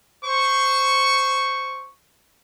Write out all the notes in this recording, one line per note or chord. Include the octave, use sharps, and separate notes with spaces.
C5 C#6